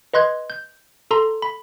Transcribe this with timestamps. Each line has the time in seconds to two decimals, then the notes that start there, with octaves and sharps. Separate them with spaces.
0.14 B4 D#5 C6 F#6 G#6
0.50 G6
1.11 A4 A#5 C6
1.42 B5